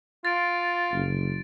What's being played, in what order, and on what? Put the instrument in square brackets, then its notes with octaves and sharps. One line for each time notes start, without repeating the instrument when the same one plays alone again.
[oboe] F4 [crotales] A6 D7
[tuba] F#1